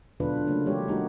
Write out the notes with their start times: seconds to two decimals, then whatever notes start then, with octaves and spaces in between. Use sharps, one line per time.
0.20 B2 D3 F#3 D4 F4 B4
0.47 C#3 F#3 A3 A#3
0.66 E3 G3 G#3 D#4 G4 C#5
0.88 G#3 A#3 D#4 F4 F#4